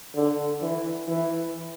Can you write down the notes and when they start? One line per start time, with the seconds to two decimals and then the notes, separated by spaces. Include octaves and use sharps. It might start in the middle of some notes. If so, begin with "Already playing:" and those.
0.15 D3
0.62 E3
1.08 E3